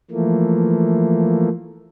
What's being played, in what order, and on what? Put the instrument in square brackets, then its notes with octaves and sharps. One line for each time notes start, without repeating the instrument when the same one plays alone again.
[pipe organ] E3 F3 A3 A#3